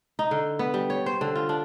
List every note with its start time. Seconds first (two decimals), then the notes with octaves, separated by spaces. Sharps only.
0.19 D#4
0.31 D3
0.59 B3
0.74 G3
0.90 C#5
1.06 C5
1.21 D3
1.35 F4
1.49 D4